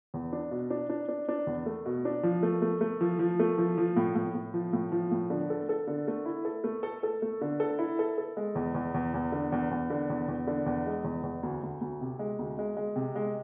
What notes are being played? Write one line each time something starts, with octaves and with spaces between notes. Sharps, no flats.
E2
D4
B2
D4
D4
D4
D4
E2
A3
B2
D4
F3
A3
A3
A3
F3
F3
A3
F3
F3
A2
A2
A2
F3
A2
F3
A2
D3
A4
A4
D3
A3
E4
A4
A3
A4
A4
A3
D3
A4
E4
A4
A4
G#3
E2
E2
E2
E2
D3
E2
E2
D3
E2
E2
D3
E2
G#3
E2
E2
D2
D2
D2
C3
G#3
D2
G#3
G#3
C3
G#3